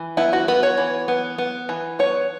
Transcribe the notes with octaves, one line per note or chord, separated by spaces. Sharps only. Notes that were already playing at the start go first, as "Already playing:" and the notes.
Already playing: E3
B3 E4
F#4
B3 B4
C#5
E3
B3
B3
E3
B3 C#5